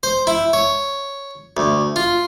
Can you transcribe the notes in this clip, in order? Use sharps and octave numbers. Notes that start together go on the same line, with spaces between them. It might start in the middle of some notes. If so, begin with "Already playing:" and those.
C5
E4
C#5
D2
F4